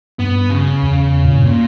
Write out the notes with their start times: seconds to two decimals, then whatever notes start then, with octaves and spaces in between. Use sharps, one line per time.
0.19 G2 B3
0.50 C#3
0.82 E2
1.24 A#2
1.34 G2
1.45 A#2